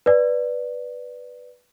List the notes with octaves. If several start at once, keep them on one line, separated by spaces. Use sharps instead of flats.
B4 D5